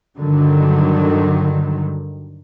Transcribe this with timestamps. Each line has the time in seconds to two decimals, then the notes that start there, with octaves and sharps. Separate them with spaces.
0.17 G2 D3 D#3 F#3 G3